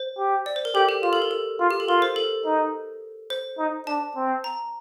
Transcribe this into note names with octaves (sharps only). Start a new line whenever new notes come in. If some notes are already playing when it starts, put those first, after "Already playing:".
Already playing: C5
G4
D5
C5
A#4
G4 A4
G4
F4 G4
A4
A#4
A4
F4
G4
A4
F4 A#4
C5
A4
D#4
C5
D#4
D4 A5
C4
A#5